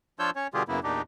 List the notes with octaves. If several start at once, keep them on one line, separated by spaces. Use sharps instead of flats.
F3 D4 F4 C#5 E6 G6
C#4 C#5
B2 D3 G3 F4 G4 G#4
F#2 C#3 A#3 B3 E4
E2 A#2 D4 D#4 G4